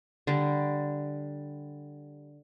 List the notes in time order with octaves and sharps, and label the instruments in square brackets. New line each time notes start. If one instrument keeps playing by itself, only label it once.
[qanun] D3 G3